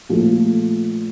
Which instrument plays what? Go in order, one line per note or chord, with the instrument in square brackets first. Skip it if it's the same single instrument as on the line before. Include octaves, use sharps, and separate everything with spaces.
[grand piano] A#2 F3 A3